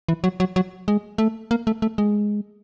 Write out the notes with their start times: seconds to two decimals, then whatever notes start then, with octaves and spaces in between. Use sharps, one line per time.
0.09 E3
0.24 F#3
0.40 F#3
0.56 F#3
0.88 G#3
1.18 A3
1.51 A#3
1.67 A3
1.82 A3
1.98 G#3